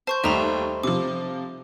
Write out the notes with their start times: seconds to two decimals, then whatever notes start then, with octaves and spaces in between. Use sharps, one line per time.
0.07 C5 A5 C#6 G6
0.24 D#2 G3 A3 D#4 E5 A#5 B5
0.84 C3 F3 D6